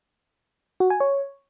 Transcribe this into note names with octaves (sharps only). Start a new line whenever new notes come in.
F#4
G#5
C#5